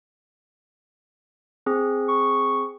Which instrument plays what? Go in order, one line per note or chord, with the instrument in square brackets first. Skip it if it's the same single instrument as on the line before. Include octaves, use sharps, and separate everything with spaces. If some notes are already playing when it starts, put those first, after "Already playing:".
[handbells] C4 G#4
[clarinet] C#6